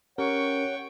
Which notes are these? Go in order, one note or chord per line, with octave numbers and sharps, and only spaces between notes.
C#4 G4 A#4 C#5 F#5 G5 C#6